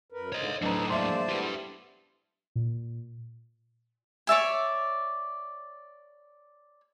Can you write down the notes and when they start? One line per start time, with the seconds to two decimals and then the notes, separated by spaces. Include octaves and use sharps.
0.12 F#2 A#4 B4
0.33 G#2 D3 C5 C#5 D#5
0.62 A2 F#3 C4 D4 D#4 A4 B4 A#5
0.89 G#3 A#3 D4 C5 D5 E5 A5 C6
1.29 A3 B3 E4 G4 B4
2.56 A#2
4.27 C#5 D5 E5 G#5